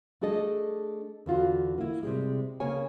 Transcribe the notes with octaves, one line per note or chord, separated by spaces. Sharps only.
A3 D4 G#4 A4 D#5
E2 D3 F4 F#4
A#3 E4
C3 G3 G#3
C#3 A#3 C#5 G#5